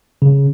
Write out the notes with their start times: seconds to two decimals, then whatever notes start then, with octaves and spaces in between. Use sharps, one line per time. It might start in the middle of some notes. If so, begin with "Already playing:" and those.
0.22 C#3